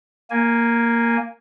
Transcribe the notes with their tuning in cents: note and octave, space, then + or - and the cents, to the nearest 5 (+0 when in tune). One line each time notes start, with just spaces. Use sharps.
A#3 +0 G#5 +0